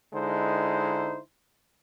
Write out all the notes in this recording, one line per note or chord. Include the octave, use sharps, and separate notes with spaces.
D3 G#3 D#4 E4 C5